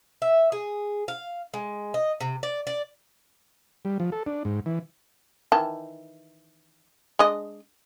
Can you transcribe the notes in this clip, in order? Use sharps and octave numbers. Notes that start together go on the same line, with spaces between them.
E5
G#4
F5
G#3
D#5
C3
D5
D5
G3
F3
A4
D4
G#2
E3
D#3 E3 A5
G#3 D4 D#5